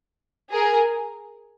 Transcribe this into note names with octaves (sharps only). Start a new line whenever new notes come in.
G#4 A#4